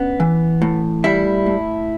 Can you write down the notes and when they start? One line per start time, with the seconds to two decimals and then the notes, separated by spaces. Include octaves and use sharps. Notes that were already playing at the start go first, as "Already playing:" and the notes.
Already playing: B3 C#4 D4
0.20 E3
0.62 A2
1.04 G3 E4 E5
1.46 A2